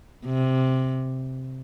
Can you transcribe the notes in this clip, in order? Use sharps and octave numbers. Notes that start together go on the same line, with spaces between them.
C3